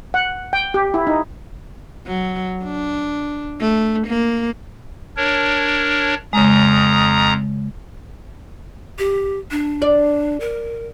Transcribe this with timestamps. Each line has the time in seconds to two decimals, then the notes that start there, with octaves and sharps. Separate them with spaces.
0.14 F#5
0.53 G5
0.74 G4
0.94 E4
1.07 D#4
2.07 F#3
2.64 D4
3.61 A3
4.07 A#3
5.17 D4 A#4 C#5
6.33 F2 C#3 G#3 A#5 D#6
8.98 G4
9.51 D4
9.82 D5
10.40 A#4